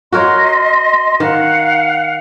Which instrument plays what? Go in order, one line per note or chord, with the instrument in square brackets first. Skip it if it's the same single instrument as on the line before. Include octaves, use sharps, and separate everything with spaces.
[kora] F#4 A#4 C#5 [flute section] D#5 C6
[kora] D#3 [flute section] F5 F#5